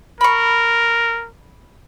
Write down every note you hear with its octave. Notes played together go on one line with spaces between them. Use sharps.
A#4 B5 C#6